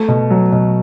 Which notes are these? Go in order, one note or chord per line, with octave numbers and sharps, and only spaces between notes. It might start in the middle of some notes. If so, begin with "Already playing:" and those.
Already playing: A3
B2
F#3
B2